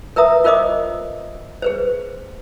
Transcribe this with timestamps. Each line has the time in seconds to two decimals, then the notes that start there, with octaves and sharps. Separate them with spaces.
0.16 A#4 B4 E5 A#5 D#6
0.44 F4 A#4 C5 D#5 D6 D#6
1.62 G#4 B4 C5